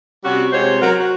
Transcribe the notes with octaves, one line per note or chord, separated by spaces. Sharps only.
C3 G3 C#4 F#4
C3 G#3 F4 C5 C#5
F#3 A#4
F#4